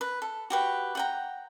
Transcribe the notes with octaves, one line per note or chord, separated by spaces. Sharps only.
B4
A4
F#4 G4 B4
F#5 G5 A#5